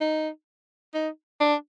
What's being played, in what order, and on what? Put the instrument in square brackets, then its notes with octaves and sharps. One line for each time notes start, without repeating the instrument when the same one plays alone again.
[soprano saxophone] D#4
D#4
D4